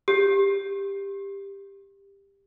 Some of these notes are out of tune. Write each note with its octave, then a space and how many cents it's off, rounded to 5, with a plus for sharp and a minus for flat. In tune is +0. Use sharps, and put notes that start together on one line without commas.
G4 +15